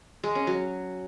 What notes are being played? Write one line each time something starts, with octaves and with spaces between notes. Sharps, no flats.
G#3
C#4
F#3